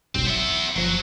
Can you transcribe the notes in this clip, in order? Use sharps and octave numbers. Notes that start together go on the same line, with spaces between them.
F1 B1 G2 C4
F#3 B3 E5
F#1 F3 F#3